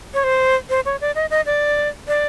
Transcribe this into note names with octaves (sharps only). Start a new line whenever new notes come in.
C#5
C5
C5
C#5
D5
D#5
D#5
D5
D5